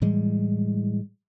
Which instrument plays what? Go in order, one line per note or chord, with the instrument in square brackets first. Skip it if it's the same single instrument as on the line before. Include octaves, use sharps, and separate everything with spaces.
[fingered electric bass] A2 E3 G3 G#3